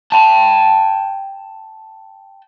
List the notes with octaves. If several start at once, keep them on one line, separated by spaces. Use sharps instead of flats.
G5 A5